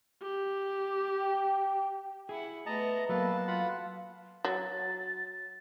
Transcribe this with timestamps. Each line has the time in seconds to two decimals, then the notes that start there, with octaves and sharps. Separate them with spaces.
0.22 G4
1.19 G5
2.29 E4 G#4 F#5
2.66 A3 B3 D#5 A5 A#5
3.09 F#3 A#3 B3 A4 B4 F5 A5
3.48 F4 F#5 B5
4.45 F#3 A6